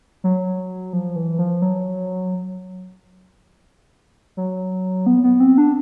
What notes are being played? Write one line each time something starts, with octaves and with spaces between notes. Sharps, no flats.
F#3
F3
E3
F3
F#3
F#3
B3
B3
C4
D4